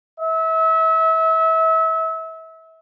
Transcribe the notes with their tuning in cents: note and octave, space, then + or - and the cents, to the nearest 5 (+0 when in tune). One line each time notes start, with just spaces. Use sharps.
E5 -30